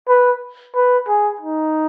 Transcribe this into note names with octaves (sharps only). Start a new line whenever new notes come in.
B4
B4
G#4
D#4